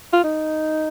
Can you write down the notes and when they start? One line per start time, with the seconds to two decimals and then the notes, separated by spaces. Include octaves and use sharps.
0.13 F4
0.24 D#4